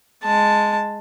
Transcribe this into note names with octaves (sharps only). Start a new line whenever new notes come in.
G#3 A5